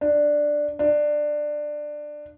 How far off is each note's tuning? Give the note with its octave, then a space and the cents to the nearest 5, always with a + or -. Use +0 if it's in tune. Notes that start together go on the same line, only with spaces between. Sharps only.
D4 +5
D4 +15